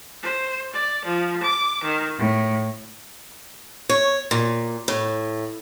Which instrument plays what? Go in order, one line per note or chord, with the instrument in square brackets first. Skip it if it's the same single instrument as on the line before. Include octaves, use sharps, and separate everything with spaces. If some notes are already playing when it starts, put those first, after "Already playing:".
[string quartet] C5
D5
F3
D6
D#3
A2
[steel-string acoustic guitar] C#5
A#2
A2